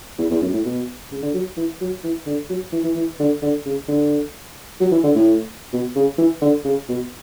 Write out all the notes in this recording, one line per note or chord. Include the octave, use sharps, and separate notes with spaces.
E2
E2
F#2
A2
B2
C#3
D3
F#3
E3
F#3
E3
D3
F#3
E3
E3
E3
D3
D3
C#3
D3
F#3
E3
D3
A2
B2
C#3
E3
D3
C#3
B2